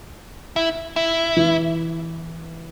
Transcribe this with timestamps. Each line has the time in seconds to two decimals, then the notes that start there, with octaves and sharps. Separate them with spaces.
0.56 E4
0.96 E4
1.37 E3